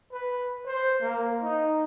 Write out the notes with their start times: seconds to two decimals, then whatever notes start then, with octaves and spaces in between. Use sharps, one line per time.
0.12 B4
0.66 C5
1.02 A#3
1.42 D#4